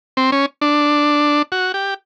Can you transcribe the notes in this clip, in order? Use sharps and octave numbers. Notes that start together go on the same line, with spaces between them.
C4
C#4
D4
F#4
G4